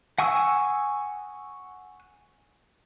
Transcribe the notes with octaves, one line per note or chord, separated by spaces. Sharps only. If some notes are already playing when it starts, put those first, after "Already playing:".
F#5 G#5 C#6 D#6 E6